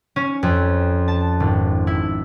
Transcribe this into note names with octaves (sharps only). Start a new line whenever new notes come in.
C#4
F2
A5
G#1
E4